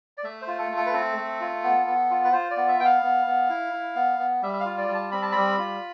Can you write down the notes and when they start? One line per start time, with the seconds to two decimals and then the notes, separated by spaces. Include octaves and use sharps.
0.17 D5
0.24 A3 E5
0.42 C5
0.47 F4
0.58 A4
0.71 A3
0.77 A4
0.86 B4
0.93 C4 A4
1.17 A3
1.40 F4
1.64 B3
1.87 B3
2.10 F4
2.24 B4
2.33 F4 C5
2.51 D5
2.57 B3
2.68 E5
2.79 B3 G5
2.85 F5
3.02 B3
3.26 B3
3.50 E4
3.73 E4
3.95 B3
4.19 B3
4.42 G3 E5
4.53 E5
4.60 F5
4.65 F4
4.78 D5
4.88 G3
4.94 A5
5.12 C4 B5
5.22 A5
5.32 G3 B5
5.58 F4